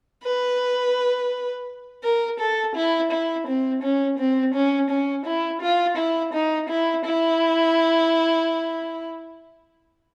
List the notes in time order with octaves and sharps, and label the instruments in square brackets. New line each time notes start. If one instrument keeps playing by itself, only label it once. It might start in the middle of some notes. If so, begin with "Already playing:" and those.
[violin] B4
A#4
A4
E4
E4
C4
C#4
C4
C#4
C#4
E4
F4
E4
D#4
E4
E4